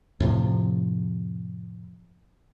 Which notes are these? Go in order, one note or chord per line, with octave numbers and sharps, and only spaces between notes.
F2 A2 C3 F3